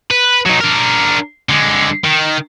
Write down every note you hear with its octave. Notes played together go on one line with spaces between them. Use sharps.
B4
F#3 D#4
D4 A#4
D3 G#3
D#3